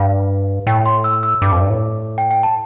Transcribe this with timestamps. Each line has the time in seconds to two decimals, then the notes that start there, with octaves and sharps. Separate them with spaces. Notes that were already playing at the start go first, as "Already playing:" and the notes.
Already playing: G2 F5
0.67 A2 G5
0.86 C6
1.04 E6
1.23 E6
1.42 G2 D6
1.52 F2
1.61 G2
1.70 A2
2.18 G5
2.31 G5
2.43 A5